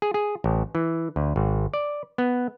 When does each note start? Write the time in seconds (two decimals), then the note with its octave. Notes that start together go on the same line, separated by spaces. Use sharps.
0.02 G#4
0.14 G#4
0.44 A1
0.75 E3
1.16 D2
1.36 G#1
1.74 D5
2.18 B3